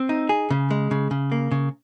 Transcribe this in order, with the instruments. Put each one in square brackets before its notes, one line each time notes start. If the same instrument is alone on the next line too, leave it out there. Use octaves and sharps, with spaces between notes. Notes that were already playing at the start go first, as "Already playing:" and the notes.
Already playing: [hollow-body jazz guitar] C4
D#4
G#4
C#3
G#3
C#3
C#3
A#3
C#3